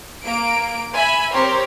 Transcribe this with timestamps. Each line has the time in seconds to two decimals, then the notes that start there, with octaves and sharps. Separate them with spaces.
0.25 A#3 D7
0.94 E5 G#5 B5
1.33 C4 G4 A#4 C5 C#5